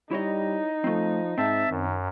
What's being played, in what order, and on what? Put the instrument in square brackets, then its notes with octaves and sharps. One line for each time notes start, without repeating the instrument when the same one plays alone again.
[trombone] G3 [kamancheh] D#4 [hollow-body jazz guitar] E4 C#5 D#5
[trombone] F3 [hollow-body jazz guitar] A3 C4
[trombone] G#2 [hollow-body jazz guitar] C4 [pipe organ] E5 A5
[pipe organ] F#2 [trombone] D#3